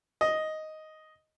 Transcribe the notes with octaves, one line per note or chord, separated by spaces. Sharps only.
D#5